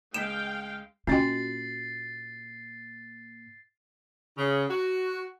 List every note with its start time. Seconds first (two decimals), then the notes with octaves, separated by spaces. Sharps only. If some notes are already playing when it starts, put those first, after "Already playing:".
0.14 C#2 G#3 F5 G5 B6 E7
1.07 A#2 C#4 F4 F#4 D#5 G5 A6 C7
4.37 C#3
4.69 F#4